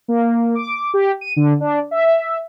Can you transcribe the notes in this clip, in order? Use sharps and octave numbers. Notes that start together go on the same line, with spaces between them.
A#3
D6
G4
D#7
D3
D4
E5